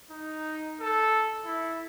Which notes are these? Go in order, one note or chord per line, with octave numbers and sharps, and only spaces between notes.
D#4
A4
E4